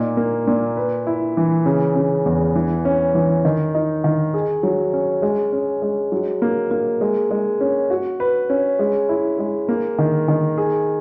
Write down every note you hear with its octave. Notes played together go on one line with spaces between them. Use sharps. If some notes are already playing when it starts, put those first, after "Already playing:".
Already playing: A#2 D#4
A#3
A#2
B4
E4
E3
C#3
C#3
E2
E3
C#4
E3
D#3
D#4
D#3
G#4
F#3
C#4
G#3
C#4
G#3
F#3
A#3
A#3
G#3
G#3
C#4
F#4
B4
C#4
G#3
E4
G#3
A#3
D#3
D#3
G#4